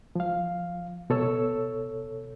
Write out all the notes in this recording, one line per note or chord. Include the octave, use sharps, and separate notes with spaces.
F3 F5
B2 A4 C#5 E6